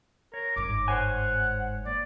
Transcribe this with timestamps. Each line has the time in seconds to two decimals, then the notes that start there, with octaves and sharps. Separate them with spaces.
0.34 A#4 C#5
0.56 G1 G#2 D6
0.88 C5 C#5 F#5 G#5
1.86 A#3 D5